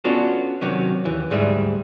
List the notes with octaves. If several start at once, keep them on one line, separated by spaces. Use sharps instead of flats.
B3 C#4 D4 F4 F#4 A4
C3 D#3 F#3 C#4
D#2 E3
D2 G#2 G3 G#4 E5